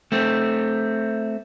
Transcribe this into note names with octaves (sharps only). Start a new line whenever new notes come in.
A3 C4